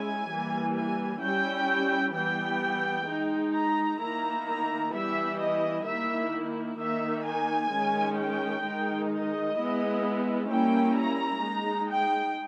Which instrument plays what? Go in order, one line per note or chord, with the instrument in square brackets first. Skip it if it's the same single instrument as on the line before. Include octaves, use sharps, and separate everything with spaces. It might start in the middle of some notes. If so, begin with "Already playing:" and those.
Already playing: [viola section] G#3 C#4 E4 G#5
E3 G3 A#3
G#5
G3 C#4 E4 G5
E3 G3 B3 G5
G#3 D#4
A#5
D#3 A#3 E4 A#5
A#5
E3 G3 B3 E4 E5
D#5
D#3 A#3 E4 E5
D#3 A#3 D#4 E5
G#5
D#3 G#3 C#4
G5
D#3 G#3 D#4
D#5
G#3 B3 E4
G3 A#3 C#4 E4 G5
A#5
G#3 D#4
G5